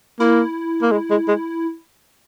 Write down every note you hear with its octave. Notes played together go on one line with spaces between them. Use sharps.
A#3 E4
A#3
G#3
G#3
G#3